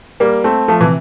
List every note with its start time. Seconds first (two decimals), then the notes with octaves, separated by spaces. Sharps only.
0.20 G3 A#3
0.44 A3 C4
0.68 F3 A3
0.81 C3 E3